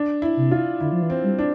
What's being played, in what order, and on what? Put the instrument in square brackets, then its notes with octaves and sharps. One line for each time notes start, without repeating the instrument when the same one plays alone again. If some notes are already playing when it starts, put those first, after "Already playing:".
Already playing: [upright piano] D4
E4
[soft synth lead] C3
[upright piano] F4
[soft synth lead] D3 [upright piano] E4
[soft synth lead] F3
E3
[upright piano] C4
[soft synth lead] G3
[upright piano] D4